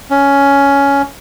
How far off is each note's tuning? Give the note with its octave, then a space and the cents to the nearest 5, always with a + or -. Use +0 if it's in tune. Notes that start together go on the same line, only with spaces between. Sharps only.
C#4 +10